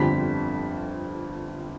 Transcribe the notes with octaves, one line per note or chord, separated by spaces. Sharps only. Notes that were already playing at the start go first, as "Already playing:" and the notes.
Already playing: G1 F2 D3 G3 B6